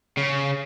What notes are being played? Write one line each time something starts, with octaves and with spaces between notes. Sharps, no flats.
C#3